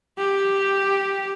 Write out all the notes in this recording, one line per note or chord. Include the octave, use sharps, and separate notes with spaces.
G4